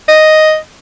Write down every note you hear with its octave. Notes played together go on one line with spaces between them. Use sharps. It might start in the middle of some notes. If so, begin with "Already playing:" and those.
D#5